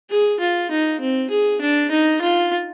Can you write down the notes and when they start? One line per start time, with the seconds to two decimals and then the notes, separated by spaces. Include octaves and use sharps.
0.10 G#4
0.40 F4
0.71 D#4
1.01 C4
1.30 G#4
1.61 D4
1.91 D#4
2.21 F4